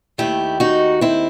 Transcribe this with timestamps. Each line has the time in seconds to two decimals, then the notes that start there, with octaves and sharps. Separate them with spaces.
0.18 D#2 D#3 A3 E4 G4
0.60 D#4 F#4
1.01 C4 E4